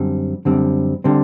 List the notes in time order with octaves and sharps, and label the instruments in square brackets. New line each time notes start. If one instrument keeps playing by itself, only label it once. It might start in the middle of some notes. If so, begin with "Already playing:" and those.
Already playing: [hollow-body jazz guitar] F#2 D3 G3 C4
F#2 D3 G3 C4
D3 G3 C4